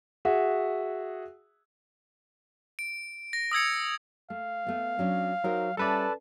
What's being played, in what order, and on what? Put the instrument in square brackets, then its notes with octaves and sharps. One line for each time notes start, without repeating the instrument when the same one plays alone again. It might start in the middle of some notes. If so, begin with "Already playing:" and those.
[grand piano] F#4 G#4 E5 F#5
[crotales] D7
A#6
D#6 E6 G#6 C#7
[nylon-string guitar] A3 [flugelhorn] F5
[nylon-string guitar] A3 B3
F#3 C#4 D4
[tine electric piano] F#3 [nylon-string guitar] D#4 A#4 C5
[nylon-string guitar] G3 C#4 E5 [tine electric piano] A4 B4 D5 [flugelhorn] A5